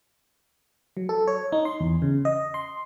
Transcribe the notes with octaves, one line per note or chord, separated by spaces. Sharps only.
F#3
A4
C#5
D#4
C6
E2
C#3
D#5
C6